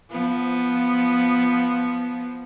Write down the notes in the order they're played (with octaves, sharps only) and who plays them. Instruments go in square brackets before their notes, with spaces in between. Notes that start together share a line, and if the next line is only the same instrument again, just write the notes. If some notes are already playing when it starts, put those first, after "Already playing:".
[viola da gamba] F3 B3